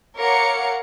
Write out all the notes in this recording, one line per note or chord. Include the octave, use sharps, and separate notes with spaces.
A#4 C#5 F5 F#5 D6 C#7